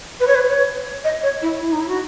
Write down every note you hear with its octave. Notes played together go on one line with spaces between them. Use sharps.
B4
C#5
B4
C#5
D#5
C#5
E4
E4
D#4
E4
F#4